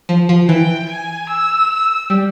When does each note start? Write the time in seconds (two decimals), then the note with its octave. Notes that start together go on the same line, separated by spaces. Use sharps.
0.09 F3
0.29 F3
0.49 E3 G5
0.89 G#5
1.29 E6
2.10 G3